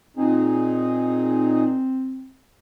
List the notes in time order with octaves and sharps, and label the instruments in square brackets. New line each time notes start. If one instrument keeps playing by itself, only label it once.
[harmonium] A#2 D#4 G#4 [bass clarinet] C4